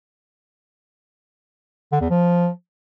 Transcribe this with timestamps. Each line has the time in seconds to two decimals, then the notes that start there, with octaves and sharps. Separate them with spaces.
1.92 D3
2.01 E2
2.10 F3